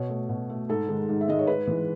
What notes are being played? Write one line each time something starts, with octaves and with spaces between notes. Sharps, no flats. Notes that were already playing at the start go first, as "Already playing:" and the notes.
Already playing: B2 C#5
A3
B2
A3
G#2 A4
D#3 G#3
G#2
E5
D#3 G#3 D#5
C#5
G#2 B4
E3 G#3